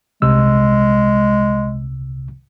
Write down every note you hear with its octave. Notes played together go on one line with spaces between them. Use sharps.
C2 C3 G#3 E6